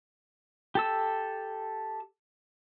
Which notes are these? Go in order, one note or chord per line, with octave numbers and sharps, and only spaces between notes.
G4 A4 E6